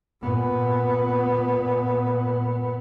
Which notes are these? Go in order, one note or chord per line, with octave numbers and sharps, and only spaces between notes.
A#2 B3